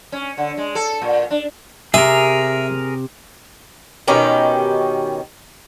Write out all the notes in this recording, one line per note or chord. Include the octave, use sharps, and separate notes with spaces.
C#4
D3
G#3
A4
A#2
D4
C3 G#4 A#4 E5
B2 D#3 C#4 G4